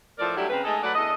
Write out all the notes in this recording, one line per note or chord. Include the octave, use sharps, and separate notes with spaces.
A2 F3 A4 A#4 D5
F#3 G3 A3 D4 E4 G4
C#3 C4 A#4 B4
G#3 A3 D#4 G#4 A4
F#3 A3 B4 D5 F#5
E2 D4 A4 D#5